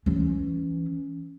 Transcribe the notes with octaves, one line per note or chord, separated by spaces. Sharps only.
E3 C#4